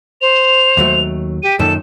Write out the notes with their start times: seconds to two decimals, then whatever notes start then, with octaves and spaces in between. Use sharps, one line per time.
0.21 C5 F7
0.77 D#2 F#3 A3
1.42 G4 D#7
1.59 F#2 A#2 D#3 A4 E7